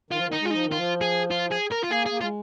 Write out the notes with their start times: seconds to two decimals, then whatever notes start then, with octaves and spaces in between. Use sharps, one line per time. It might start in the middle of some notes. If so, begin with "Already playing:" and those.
0.11 D#3 F4
0.18 F3
0.26 D#3
0.32 D#4
0.41 G#3 F4
0.50 F3 D#4
0.65 D#3
0.72 F4
0.78 F3
1.01 G#4
1.31 F4
1.51 G#4
1.71 A#4
1.83 F4
1.91 A#3 G#4
2.06 G#4
2.11 A#3
2.21 G#3 F4